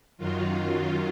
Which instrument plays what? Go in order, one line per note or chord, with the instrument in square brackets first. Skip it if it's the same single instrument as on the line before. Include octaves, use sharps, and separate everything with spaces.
[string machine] F#2 D#3 F#3 F4